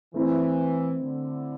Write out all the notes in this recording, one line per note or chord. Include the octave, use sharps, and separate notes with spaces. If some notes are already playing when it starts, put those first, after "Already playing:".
E3 A3 C4 E4
D3